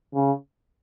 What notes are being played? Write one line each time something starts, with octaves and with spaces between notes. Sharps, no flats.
C#3